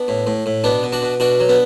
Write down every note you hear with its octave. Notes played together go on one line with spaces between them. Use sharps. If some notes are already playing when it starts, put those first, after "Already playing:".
Already playing: B3 D4
A2
A2
A2
B2 B3 D4
B2
D4 F#4
B2
B2 D4 F#4
F#3
B3 D4